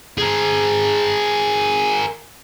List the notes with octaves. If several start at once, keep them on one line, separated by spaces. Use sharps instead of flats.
G#4 A#4